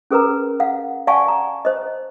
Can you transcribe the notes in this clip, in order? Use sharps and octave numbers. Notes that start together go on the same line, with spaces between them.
C#4 G#4 A#4 B4 A#5
F5 F#5
D5 F5 F#5 G#5 A5 C#6
A#5
C5 D#5